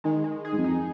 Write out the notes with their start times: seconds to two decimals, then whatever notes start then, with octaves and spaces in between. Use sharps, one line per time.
0.04 D#3 G#3
0.24 G#3
0.45 G#4
0.52 G#2
0.58 F2
0.64 D#4